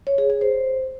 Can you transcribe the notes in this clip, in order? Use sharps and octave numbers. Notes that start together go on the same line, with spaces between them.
C#5
G#4
G#4
C5